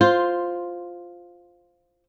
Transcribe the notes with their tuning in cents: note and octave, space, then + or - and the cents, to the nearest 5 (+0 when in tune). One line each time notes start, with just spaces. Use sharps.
F4 +5 C5 +0